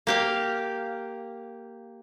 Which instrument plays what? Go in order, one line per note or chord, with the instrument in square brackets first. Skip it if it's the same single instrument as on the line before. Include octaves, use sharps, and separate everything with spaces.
[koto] A#3 G4 F5